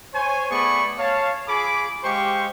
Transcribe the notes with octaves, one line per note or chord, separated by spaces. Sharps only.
C5 C#5 G#5
A3 B3 G#4 D5 B5 C#6
C#5 F5 A5
F4 G#4 B5 D6
G#3 G4 C5 F5 G5 C#6